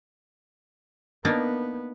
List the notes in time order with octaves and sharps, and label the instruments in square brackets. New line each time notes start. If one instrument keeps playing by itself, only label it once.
[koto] A#3 D4 D#4 [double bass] B3